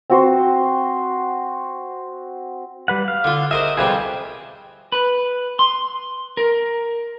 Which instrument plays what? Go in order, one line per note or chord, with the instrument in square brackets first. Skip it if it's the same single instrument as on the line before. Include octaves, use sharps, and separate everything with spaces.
[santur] C4 F#4 C5
[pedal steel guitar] G3 B4 F#5
F5
[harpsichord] D3 F4
[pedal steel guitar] F#4 D#5 E5 [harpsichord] G#4 A#4 C5
[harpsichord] F2 C3 G3 [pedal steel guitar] G#4 B4 C5
[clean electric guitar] B4
C6
A#4